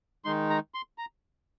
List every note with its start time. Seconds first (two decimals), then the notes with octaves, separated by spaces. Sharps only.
0.25 D#3 G#3 D#4 C6
0.50 A#5
0.74 C6
0.98 A#5